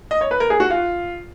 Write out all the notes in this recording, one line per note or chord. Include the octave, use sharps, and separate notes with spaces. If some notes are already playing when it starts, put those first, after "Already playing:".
D#5
C#5
B4
A#4
G#4
F#4
F4